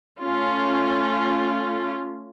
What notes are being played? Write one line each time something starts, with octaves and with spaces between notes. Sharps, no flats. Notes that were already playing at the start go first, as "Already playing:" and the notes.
A3 C#4 F4